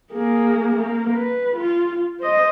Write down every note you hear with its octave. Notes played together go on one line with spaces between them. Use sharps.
A#3 G#4
A#3
B4
F4
C5 D#5